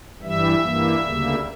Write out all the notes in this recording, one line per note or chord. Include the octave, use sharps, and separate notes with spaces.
G2 E3 G3 E5
G2 E3 G3 A#3
D2 C#3 G3 A#3